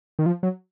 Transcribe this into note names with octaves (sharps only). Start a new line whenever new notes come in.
D#3
F3
F#3